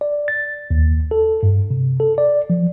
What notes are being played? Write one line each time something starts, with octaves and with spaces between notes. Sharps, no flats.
D5
A6
D#2
A4
G2
C3
A4
D5
F3